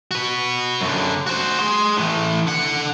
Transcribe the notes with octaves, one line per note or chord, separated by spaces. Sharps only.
F#4 B4
F#2 D3
F#4 C5
G#4 C6
A2 E3
D3 F#5